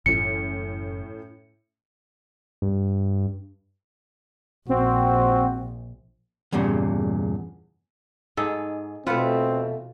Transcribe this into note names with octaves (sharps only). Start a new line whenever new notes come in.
F#1 F#2 A2 E3 C#4 C#7
G2
A#1 C4 F#4
E2 G2 A#2 C#3
G#2 D#4 G#4 A4
E2 B2 A3 C4 F4 B4 F#5